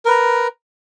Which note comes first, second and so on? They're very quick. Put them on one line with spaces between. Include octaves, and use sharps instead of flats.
A#4 B4 A#5